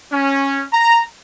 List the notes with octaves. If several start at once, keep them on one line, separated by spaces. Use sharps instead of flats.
C#4
A#5